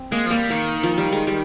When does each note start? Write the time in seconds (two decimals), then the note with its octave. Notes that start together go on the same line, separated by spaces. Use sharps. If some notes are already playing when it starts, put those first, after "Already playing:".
Already playing: C4
0.12 G#3 A#3
0.26 F3
0.30 G3 A#3
0.50 D#3 A#3
0.83 F3
0.98 G3
1.12 G#3
1.27 G3